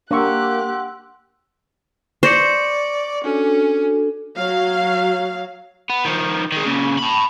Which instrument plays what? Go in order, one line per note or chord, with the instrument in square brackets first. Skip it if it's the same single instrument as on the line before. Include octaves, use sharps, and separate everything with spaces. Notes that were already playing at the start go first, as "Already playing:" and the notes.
[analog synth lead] A#3 [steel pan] D4 C#6 [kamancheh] G4 F#6 [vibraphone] F#5 C6 E6
[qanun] C5 [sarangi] D5 [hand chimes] C#6 A#6 C#7
[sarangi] C#4 [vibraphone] D4 F#4 A4
[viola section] F#3 F5
[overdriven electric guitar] B3
D#3 F3
D#3 G#3
A#2 C#3
A5 B5